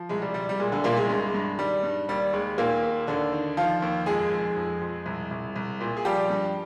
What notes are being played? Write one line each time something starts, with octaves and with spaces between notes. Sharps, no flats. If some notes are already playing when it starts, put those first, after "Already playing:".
Already playing: F3
C2 G#3
G3
C2 G3
G3
A#2 G#3
D3 D4
C2 A#2 A#3
G#3
G2 G#3
G2
D#3 G3
G2
D#2 G3
D#2 G#3
D#2 A#2 A#3
D#2
D#2 D3 D4
D#3
D#3 F3 F4
D#2
F2 G#3 G#4
F2
F2
F2
C2
C2
C2
A#2
G#4
F3 G3 G4
G2